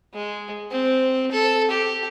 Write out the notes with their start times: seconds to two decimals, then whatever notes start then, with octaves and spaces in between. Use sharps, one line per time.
0.14 G#3
0.71 C4
1.32 A4
1.71 G4